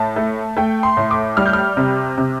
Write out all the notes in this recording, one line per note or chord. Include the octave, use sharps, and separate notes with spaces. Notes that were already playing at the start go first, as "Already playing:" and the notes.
Already playing: A2 A5
A3
A3 G5
C6
A2
D6
G3 F6
G6
F6
C3
C3